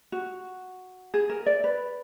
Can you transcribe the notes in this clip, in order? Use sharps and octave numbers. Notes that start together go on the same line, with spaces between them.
F#4
G#4
A#4
D5
B4